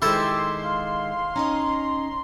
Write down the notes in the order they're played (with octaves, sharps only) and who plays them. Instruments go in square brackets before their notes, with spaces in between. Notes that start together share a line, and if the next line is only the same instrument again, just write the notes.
[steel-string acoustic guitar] D#3 G#3 [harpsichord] E4 A4 C5 [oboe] G4 [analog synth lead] C6
[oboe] F5
[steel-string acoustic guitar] C#4 D#4 D#5 [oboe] A#5